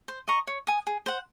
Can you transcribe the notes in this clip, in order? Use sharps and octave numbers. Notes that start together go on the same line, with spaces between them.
C5
D#5 A#5 C#6
C#5
G#5 D#6
G#4
C5 F#5